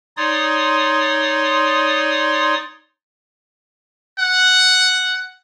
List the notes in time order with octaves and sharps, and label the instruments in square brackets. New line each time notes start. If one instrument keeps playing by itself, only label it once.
[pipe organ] D#4 C#5 D5 C6 D#6
[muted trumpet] F#5